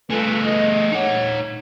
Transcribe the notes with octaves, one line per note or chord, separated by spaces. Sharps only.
A3 F4 G#4 A4 B4
D#5
D#4 C#5 F#5